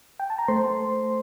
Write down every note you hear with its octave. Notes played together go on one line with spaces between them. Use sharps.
G5
A5
A#5
A3 C5 C6